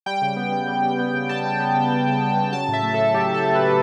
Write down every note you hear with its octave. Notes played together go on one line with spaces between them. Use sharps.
G3 G5
C#3
B3
C#3
G3
C#3
B3
C#3
G3 A5
C#3
B3
C#3
G3
C#3
B3
C#3
F#3 A5
A2
E5
A3
A2 A4
F#3 G4
A2
A4
A3
A2 B4